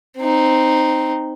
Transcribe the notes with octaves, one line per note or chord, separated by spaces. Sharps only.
C4 D#4